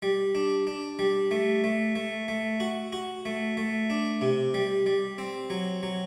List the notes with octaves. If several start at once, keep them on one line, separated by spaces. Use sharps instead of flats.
G3
D4
D4
G3
A3
A3
A3
A3
F#4
F#4
A3
A3
D4
C3
G3
G3
C4
F#3
F#3